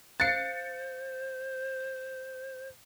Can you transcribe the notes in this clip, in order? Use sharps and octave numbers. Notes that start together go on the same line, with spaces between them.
C5 F5 F#6 A6 C#7